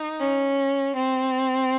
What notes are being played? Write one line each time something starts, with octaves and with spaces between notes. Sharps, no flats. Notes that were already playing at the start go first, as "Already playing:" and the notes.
Already playing: D#4
C#4
C4